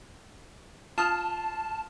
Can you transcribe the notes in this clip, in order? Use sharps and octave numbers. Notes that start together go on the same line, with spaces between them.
F4 A5 D#6 F6